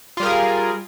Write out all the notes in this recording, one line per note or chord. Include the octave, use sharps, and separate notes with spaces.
G3 F4 G#4 A#4